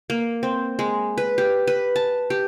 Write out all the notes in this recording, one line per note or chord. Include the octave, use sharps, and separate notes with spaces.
A#3
C4
G#3
B4
G4
B4
A5
G4